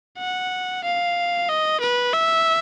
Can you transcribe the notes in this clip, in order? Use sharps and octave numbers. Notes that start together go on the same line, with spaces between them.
F#5
F5
D#5
B4
E5